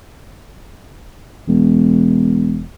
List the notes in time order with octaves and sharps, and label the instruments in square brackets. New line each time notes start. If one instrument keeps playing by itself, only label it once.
[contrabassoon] E1